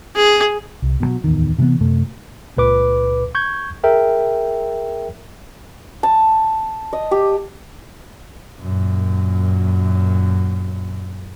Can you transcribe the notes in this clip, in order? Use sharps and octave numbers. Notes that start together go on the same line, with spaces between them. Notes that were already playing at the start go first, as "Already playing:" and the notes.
G#4
C2
B2 D3 F#3
D1 E2 D#3
C3 E3 F3 B3
F#2 C3 A3
C#2 A#2 B4 D6
C#6 G6 G#6
G#4 A#4 E5 G5
A5
D#5
G4
F#2 A#2